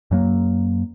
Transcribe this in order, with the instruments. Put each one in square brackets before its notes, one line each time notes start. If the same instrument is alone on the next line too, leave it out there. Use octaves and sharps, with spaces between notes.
[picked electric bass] F#2 F#3 A#3